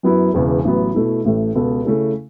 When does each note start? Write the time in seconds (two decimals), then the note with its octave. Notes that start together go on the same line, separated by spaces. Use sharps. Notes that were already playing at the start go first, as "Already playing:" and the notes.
0.03 F#2 F#3 B3 E4 B4
0.34 E1 E2 C#3 E3
0.64 A1 A2 F#3 B3
0.95 B2 A3 E4
1.25 A1 A2 A3
1.55 C#2 B2 B3 A4
1.85 C#3 A3 C#4 E4 A4